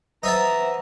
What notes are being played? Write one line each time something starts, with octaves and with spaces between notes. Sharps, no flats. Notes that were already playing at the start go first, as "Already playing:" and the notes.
E3 C5 D#5 E5 F#5 A5 A#5